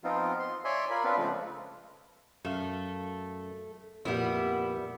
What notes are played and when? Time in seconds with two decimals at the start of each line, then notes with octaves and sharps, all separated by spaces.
0.04 F3 B3 C4 D#4 F4
0.39 C6
0.65 C#5 D5 E5 G#5 C6
0.90 F4 A#4 B5
1.04 B3 C4 D4 F4 B4
1.18 C#3 F3 G#3 A3
2.45 F#2 A3 A4 F5
4.05 F2 A#2 G3 B3 E4 D5